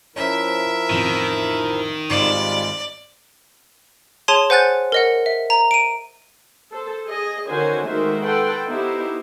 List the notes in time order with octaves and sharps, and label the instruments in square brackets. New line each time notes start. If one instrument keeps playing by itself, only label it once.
[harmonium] F3 E4 A#4 [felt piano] C#4 C5 [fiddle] E5
[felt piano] A1 F2 [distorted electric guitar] D#3
[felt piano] G#1 C7 C#7 [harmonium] G3 G#3 F4 [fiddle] D5
[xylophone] G#4 C#5 A5 C6 D#7
C5 F#5 G#5 F#6 G6 A6
A#4 D#5 F#5
E5
A#5
D7 D#7
[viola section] A4 C5
G#4 D#5
D3 D#3 C#4 F#4 C5 G#5
D#3 G#3 A3 F#4 C5 E5
A4 B4 F#5 G5 C6
B3 D#4 E4 G4 C5